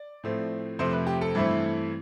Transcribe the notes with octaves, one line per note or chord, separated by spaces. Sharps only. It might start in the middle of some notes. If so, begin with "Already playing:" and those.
Already playing: D5
A2 F3 A3 C4
F2 C3 F3 A3 C4 C5
B4
G4
A4
G2 E3 A3 C4 E4